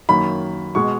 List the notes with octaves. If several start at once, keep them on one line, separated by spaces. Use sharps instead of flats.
F#2 D#3 A#3 B5
B2 G#3 C#6